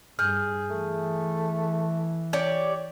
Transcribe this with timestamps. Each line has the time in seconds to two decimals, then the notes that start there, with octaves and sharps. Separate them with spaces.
0.19 G2 G#4 F6 G6
0.70 E3 A3
2.33 G4 C#5 D5